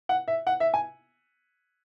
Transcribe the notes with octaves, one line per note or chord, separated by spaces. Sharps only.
F#5
E5
F#5
E5
G#5